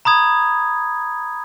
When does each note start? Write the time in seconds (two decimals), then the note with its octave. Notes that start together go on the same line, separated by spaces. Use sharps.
0.05 A#5 B5 D#6 G#6